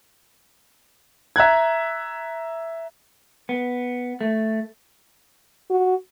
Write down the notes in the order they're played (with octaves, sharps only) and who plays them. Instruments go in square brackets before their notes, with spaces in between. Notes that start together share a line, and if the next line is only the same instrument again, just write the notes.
[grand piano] E5 A#5 F#6 G#6
[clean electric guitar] B3
A3
[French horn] F#4